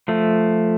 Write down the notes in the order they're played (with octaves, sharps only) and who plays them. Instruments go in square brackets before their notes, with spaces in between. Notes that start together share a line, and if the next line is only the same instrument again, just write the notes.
[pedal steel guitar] F3 A3